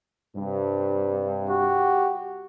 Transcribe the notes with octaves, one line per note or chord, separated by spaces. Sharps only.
G2 C3
F#4 G4